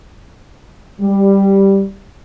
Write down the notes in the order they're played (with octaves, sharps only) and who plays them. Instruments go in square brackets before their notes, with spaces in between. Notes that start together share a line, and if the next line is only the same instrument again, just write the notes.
[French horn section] G3